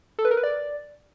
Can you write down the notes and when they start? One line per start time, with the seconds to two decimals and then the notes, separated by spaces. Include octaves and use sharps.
0.19 A4
0.25 B4
0.31 A#4
0.37 B4
0.43 D5